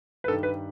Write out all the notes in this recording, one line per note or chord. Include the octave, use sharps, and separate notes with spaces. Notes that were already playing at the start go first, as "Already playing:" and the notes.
B4
G2 D#3 A4
B4